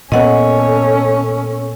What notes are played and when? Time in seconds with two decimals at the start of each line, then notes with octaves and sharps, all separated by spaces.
0.12 A#2 B3 C#4 A4 D#5 F#5